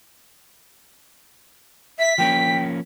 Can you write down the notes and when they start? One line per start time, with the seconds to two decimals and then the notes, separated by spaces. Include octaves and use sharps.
1.99 E5 B6
2.18 F3 A#3 C#4 G5